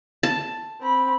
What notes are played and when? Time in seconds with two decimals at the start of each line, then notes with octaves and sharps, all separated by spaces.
0.23 A5
0.81 C4 B5